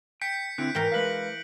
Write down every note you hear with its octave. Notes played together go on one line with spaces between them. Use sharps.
G5 G6 B6 C#7
D3 C4 E4 F#6 D7
G#2 E3 A#4 G5 A#5
G#3 B4 F5 A#6 F#7